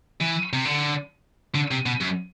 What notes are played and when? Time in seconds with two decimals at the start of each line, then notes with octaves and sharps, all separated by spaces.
0.21 E3
0.53 C3
0.65 D3
1.55 D3
1.71 C3
1.86 B2
2.01 F#2